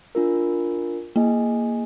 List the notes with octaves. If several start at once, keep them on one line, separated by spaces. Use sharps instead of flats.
D4 F4 A#4
A#3 G#4 D#5 G#5